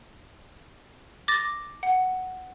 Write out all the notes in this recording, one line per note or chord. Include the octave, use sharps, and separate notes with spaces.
D6 A6 A#6
F#5